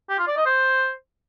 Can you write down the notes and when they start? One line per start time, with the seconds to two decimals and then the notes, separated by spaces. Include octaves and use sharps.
0.09 G4
0.18 F4
0.28 D5
0.37 D#5
0.46 C5